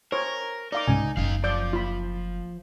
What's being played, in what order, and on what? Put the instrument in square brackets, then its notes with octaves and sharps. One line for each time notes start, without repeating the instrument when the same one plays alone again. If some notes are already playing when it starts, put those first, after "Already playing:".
[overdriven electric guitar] A#4 [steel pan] C5 C#5
[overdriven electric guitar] D#4 [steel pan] D5 F5 D6
[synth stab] C2 G#2 C#3 [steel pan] G#5
[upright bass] F#1 [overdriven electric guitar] D#4 F5
[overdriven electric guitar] F3 [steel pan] D5 [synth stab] D6 G6
[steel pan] F4 B5